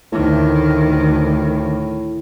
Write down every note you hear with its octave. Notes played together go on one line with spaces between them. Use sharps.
D2 A2 D#3